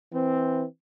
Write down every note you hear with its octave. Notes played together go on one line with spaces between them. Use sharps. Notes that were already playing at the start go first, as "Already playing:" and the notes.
E3 C4